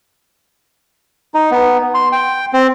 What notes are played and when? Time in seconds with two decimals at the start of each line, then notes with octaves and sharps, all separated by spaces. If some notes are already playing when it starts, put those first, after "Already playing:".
1.34 D#4
1.51 B3
1.94 C6
2.12 G5
2.53 C4